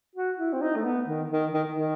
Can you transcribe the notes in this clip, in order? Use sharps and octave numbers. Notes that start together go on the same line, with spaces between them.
F#4
E4
C4
D#4
A3
B3
D#3
D#3
D#3
D#3